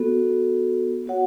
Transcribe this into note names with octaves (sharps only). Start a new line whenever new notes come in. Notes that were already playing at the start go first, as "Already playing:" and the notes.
Already playing: B3 F#4 A4
B3 F#4 C#5 F#5